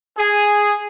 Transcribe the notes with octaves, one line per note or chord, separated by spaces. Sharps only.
G#4